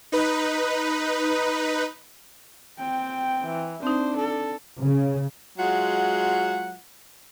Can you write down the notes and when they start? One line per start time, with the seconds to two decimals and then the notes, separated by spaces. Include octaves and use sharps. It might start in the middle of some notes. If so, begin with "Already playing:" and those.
0.12 D#4 B4
2.79 C4 G5
3.44 E3
3.83 C4 D4 D#4 C5
4.16 A4
4.80 C#3
5.58 F#3 G#3 F4 F#5